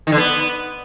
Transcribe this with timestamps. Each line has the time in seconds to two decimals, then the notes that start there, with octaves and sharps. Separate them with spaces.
0.07 D#3
0.12 D3
0.17 B3